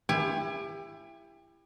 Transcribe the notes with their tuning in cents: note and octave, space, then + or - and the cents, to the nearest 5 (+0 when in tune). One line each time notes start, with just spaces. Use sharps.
E4 +20 G4 +30 G#5 +0